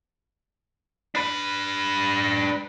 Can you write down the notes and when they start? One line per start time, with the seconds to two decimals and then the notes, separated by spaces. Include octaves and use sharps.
1.15 D4 B4